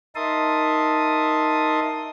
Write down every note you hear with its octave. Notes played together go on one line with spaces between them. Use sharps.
D#4 A#4 E5 A5 C6 D#6